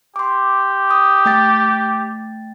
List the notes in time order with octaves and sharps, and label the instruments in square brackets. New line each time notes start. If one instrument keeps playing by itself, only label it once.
[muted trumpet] G4 [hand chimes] C6 D6
[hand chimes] D#6
A3 G5 A6